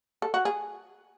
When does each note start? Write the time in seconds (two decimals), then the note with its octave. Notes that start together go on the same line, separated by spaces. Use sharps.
0.22 A4
0.34 F#4
0.45 G#4